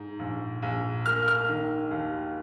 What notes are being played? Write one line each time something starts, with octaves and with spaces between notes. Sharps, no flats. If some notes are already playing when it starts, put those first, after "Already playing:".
Already playing: G#2
A#1
A#1
A#3 F6
F6
D#3
D#2